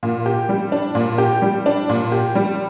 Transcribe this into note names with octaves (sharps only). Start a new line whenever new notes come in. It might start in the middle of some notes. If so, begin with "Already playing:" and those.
A#2
G4
G3
D4
A#2
G4
G3
D4
A#2
G4
G3